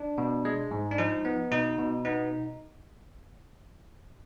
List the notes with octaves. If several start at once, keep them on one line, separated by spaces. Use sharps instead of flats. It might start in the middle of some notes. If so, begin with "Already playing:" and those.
Already playing: D4
B2
G#3
G#2
D4
F3 D#4
B3
B2 D#4
B2
B3 D#4